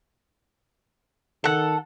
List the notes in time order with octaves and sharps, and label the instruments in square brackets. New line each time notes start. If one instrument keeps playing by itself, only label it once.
[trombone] D#3 [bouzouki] A4 F#5